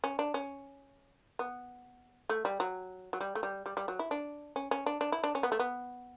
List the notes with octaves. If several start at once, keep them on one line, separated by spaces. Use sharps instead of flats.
C#4
D4
C#4
B3
A3
G3
F#3
F#3
G3
A3
G3
G3
G3
F#3
E4
D4
C#4
C#4
D4
D4
E4
D4
C#4
B3
A3
B3